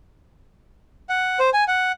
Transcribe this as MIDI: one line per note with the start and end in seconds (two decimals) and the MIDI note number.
1.09 1.39 78
1.39 1.50 72
1.53 1.64 80
1.68 1.92 78